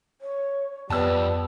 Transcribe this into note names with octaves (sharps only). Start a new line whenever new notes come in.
C#5
F2 G3 B3 A5 E6